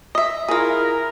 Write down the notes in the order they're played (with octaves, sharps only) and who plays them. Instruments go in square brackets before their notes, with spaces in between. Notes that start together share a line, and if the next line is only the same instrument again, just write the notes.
[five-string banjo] D#5 E5
[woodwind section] E4 A#4 [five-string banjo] F4 G#4